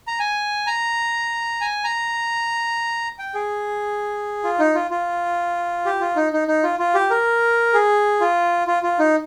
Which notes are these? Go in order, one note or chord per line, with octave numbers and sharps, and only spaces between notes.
A#5
G#5
A#5
G#5
A#5
G5
G#4
F4
D#4
F4
F4
G4
F4
D#4
D#4
D#4
F4
F4
G4
A#4
G#4
F4
F4
F4
D#4